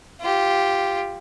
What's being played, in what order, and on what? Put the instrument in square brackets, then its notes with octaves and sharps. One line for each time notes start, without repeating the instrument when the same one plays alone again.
[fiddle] F4 G4